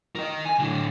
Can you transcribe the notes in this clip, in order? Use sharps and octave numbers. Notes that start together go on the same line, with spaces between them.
A#4 D#5
G#5
A2 D3